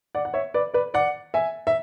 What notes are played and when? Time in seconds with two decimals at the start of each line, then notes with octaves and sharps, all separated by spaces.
0.15 D5 F#5
0.25 F#5
0.34 C#5 E5
0.54 B4 D5
0.74 B4 D5
0.94 D5 F#5
1.34 E5 G#5
1.67 E5